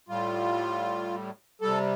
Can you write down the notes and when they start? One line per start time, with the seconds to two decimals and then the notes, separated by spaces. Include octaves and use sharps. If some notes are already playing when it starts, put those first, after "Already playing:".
0.09 A2 G3 F4
1.61 C3 G3 A4